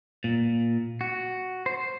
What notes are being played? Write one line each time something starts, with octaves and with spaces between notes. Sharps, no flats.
A#2
F#4
C5